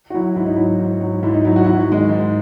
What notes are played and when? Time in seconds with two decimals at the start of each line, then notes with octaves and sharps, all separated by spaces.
0.10 F#4
0.14 F#3 E4
0.36 G#2 E4
0.46 D#4
0.56 F#3 E4
0.80 G#2
1.01 F#3
1.23 G#2 E4
1.34 D#4
1.45 F#3 E4
1.56 F#4
1.64 G#2 E4
1.74 F#4
1.88 D#3 G#3
2.09 G#2